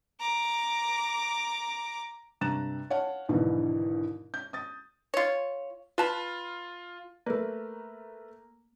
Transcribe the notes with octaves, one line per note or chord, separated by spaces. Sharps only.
A#5 D6
G2 C3 A#5 F#6 A6 E7
C#5 F5 F#5 A5
A#1 D#2 G#2 B2 D3 E3
G6
D#6 A6
F4 C#5
F4 B4 A5 B5
A3 A#3 A#4 B4